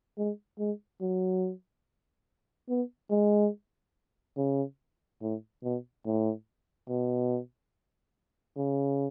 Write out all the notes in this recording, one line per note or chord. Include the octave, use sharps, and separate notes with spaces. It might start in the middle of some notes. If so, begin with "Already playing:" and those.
G#3
G#3
F#3
B3
G#3
C#3
A2
B2
A2
B2
C#3